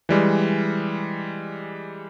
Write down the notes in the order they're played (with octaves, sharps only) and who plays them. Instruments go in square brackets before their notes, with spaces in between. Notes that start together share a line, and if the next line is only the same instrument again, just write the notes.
[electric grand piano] E3 G3 G#3